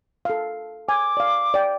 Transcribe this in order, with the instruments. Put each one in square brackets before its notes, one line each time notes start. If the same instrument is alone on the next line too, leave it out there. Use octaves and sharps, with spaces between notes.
[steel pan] A4 F5
[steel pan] G#5 [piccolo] D6
[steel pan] D5 F5
D5 G5